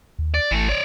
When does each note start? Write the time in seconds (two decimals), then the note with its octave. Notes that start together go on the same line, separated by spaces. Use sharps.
0.19 D#2
0.34 D5
0.51 G#1 E3 A3
0.69 C#5 D5